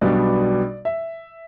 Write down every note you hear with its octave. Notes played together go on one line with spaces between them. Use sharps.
B1 B2 G3 B3 D4 D5
E5